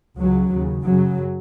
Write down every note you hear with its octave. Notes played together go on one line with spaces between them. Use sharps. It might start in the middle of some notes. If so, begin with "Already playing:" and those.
C#2 C#3 F#3
D#2 C#3
F#2 C#3 F#3